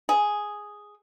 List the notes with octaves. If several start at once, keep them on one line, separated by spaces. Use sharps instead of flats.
G#4